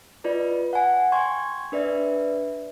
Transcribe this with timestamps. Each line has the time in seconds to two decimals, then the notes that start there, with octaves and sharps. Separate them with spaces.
0.24 F4 B4 D5 D#5
0.73 F#5 G#5
1.12 G5 C6 C#6 G#6
1.72 D4 B4 D5 E5